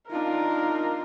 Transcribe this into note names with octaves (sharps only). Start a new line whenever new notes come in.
D4 D#4 F4 A#4